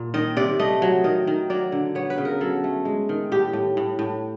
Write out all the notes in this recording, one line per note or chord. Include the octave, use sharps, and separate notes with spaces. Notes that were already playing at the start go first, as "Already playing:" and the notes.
Already playing: A#2
D#3 D#5
C3 D5
A3 D#5
F#3
D#3 D#5
D#3
F#3 D5
D3
B3 C#5
B4
C#3
A#4
F#3 A4
A3
G#3
D#3
A2 G4
A2
A2
A2